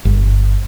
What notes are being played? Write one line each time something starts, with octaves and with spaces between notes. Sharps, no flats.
G1